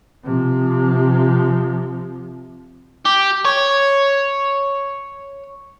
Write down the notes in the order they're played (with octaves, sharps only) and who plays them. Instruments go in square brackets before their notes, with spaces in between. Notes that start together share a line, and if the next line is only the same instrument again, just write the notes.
[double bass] C3 F3
[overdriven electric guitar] G4
C#5